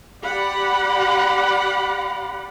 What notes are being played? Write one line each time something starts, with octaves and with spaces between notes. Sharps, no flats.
G4 D5 F#5 B5